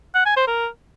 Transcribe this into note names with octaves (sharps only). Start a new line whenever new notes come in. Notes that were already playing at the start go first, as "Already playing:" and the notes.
F#5
G#5
C5
A#4